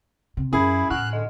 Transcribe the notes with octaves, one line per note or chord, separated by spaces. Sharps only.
C3
F#2 C#4 E4 G#4 B5 C7
E2 A2 F#5 C#6 F6 F#6
D3 D#5